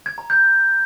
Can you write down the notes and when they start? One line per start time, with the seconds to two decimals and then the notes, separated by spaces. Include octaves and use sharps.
0.06 G#6
0.18 A#5
0.30 G6